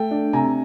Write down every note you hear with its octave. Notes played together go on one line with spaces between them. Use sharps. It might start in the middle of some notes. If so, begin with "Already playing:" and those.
Already playing: A3 G5
D4
C3 G#5 A#5